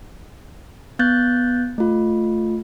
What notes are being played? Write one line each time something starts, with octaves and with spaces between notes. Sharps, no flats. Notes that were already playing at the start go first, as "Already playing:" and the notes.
B3 F#6 G6 A6
A3 F4